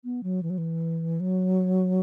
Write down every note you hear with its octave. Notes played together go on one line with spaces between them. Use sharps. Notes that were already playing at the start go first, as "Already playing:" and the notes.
B3
F#3
E3
F#3
E3
F#3